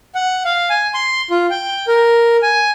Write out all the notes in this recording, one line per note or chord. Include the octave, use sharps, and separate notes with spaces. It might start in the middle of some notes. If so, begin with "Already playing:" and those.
F#5
F5
G#5
C6
F4
G5
A#4
G#5